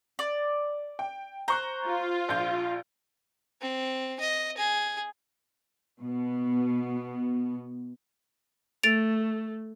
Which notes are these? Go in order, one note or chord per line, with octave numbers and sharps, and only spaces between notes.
D5
G5
C5 A#5 C#6 F#6
F4
A#1 G6
C4
D#5
G#4
B2 B3
A3 A6 D7 F7